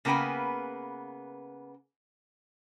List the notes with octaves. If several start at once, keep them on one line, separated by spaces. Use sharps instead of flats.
C#3 A#3 B3 B4 G5 G#5